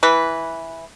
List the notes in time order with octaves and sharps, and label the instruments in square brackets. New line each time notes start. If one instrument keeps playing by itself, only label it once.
[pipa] E3 B4